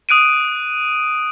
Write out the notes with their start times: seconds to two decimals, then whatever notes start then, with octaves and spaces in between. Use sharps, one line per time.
0.09 D#6 F#6 D7 D#7